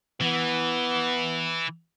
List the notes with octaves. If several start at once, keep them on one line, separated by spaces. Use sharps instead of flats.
E3 B3